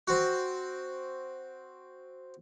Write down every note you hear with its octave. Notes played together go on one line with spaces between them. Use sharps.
C4 F#4